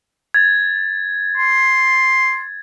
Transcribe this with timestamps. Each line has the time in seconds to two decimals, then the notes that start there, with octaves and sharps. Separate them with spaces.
0.34 G#6 A6
1.37 C6